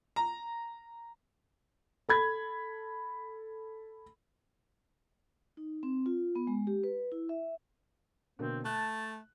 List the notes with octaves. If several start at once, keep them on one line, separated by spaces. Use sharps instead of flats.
A#5
A4 B5 G#6
D#4
C4
F4
B3
G#3
G4
B4
E4
E5
B2 D3 A#3 C4
A3 A5 F#6